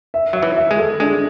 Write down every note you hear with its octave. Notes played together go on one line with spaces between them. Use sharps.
E5
F#3 E5
E3
E5
G#3
A4
G#3 D4